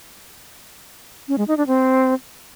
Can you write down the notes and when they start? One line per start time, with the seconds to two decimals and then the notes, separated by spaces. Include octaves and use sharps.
1.28 C#4
1.38 G#3
1.48 D#4
1.57 D4
1.67 C4